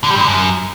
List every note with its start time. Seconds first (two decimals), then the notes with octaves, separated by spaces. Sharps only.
0.04 D3
0.10 G3
0.15 G2
0.21 D3
0.27 F#2